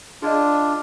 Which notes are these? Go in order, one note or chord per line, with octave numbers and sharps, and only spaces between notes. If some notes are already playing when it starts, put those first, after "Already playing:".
D4 F4 G#4 D5 D#5